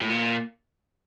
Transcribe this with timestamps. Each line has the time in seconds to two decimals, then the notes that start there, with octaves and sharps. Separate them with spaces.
0.01 A2
0.09 A#2